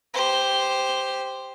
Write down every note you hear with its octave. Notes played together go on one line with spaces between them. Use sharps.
G4 C5